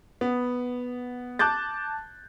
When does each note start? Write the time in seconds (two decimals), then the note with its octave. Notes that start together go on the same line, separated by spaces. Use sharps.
0.21 B3
1.39 A5 D6 F#6 G6 A6